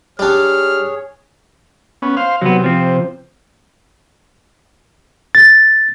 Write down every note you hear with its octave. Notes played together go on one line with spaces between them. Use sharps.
G3 D4 G#4 C#5 F6
B3 C#4
C5 F5
C3 F#3 B3
F3 C4
A6